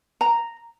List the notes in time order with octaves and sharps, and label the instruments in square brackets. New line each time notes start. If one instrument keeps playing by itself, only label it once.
[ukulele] A#5